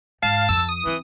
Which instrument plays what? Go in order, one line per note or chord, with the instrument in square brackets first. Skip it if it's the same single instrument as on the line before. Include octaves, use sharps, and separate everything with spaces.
[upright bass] G#2 [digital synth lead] F5 [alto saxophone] A5
[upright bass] F2 [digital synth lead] E6
[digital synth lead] D#6
[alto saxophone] E3 [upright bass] C4